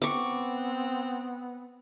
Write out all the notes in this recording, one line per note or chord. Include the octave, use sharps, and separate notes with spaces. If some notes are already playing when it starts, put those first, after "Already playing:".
B3 C4 C#6 D6